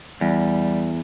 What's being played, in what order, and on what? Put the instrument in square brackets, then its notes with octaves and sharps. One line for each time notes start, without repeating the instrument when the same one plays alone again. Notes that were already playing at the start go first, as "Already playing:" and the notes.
[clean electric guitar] E2 [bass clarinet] G3